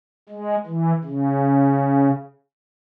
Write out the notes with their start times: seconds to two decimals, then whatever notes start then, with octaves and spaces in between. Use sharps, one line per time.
0.29 G#3
0.66 E3
1.04 C#3